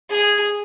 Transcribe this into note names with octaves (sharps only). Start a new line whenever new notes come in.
G#4